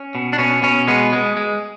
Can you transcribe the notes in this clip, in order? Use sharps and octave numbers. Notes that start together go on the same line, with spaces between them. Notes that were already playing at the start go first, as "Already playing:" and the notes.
Already playing: C#4
B2
D4
B2 C#4
B2 C#4
G#3 B3
G#3
G#3